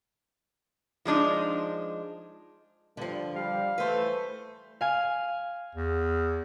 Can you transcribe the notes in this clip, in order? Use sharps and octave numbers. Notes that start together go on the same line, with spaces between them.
F3 G#3 D4 D#4
G2 D3 F3
G3 F5
E3 A3 A4 B4 C5
F5 G#5
E2